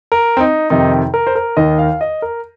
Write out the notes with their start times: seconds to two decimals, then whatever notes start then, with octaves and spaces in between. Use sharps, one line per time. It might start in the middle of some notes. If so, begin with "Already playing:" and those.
0.12 A#4
0.37 C4
0.40 D#4
0.70 F2 C3 D#3 D#4
1.14 A#4
1.27 C5
1.35 A#4
1.57 D#2 D#3 D#5
1.79 F5
2.01 D#5
2.22 A#4